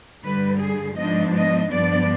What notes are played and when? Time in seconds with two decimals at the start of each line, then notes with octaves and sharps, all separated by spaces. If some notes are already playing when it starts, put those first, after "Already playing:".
0.24 G2 D3 G3 B4
0.60 G#4
0.97 G#2 F3 B3 D4 D#5
1.35 D#5
1.71 G2 F3 B3 D4 D5